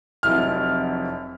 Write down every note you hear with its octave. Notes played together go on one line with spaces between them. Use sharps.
F1 F2 F#3 E4 F6